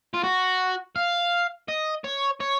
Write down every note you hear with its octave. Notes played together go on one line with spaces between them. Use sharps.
F4
F#4
F5
D#5
C#5
C#5